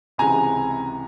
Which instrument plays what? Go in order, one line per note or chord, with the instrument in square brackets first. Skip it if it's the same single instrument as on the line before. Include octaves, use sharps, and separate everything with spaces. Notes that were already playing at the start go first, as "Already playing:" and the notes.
[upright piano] C#2 C3 E3 G#3 G#5 A#5